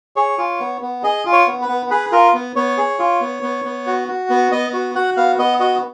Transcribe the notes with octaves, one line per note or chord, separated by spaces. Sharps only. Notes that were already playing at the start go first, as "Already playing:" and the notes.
G#4 C#5
F4
B3
B3
G#4 D#5
F4
C#5
B3
B4
B3
G#4 B4
F4 A#4
B3
B3 C#5
G#4
F4
B3
B3
B3
F#4
F#4
B3
B3 D#5
F#4
F#4 F#5
B3 F5
B3 D#5
F#4 D#5